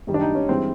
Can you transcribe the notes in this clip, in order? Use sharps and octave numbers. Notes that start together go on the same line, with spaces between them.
F#2 D#3 G3
D4
D#4
C#4
G2 E3 G#3 C4